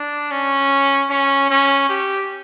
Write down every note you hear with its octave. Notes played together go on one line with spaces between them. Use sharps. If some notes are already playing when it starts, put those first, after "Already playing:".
Already playing: D4
C#4
C#4
C#4
G4